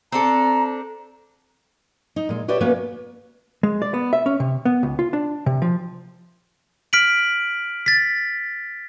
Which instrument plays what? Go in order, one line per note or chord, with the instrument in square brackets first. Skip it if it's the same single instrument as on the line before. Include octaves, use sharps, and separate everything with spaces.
[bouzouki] C4 D4 A4 [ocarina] A#5
[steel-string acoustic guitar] D#4
A#2 G#3
F#4 G4 B4 C#5 D5 E5
A#3 B3 C#4 F#4 B4
[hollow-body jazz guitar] G#3
D5
B3
E5
C#4
C3
B3
C#2
F4
D4
C3
F3
[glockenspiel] F6 B6 D7 F#7
A6 B6